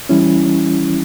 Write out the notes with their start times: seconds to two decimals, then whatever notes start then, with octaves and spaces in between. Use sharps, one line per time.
0.09 E3 G3 C#4 E4